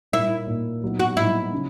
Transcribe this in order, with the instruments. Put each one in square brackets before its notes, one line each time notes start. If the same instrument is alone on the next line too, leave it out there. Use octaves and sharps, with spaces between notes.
[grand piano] A#2 A#3 D#4 [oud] E4
[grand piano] A#2 A#3 D#4
A#2 F#3 B3 D#4
[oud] F#4
[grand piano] A#2 F#3 B3 D#4 [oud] E4
[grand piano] C#3 F#3 C#4